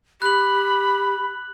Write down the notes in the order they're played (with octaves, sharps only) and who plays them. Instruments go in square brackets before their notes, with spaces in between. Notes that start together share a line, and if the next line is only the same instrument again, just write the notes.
[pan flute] G4 [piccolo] B5 [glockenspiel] F#6 F#7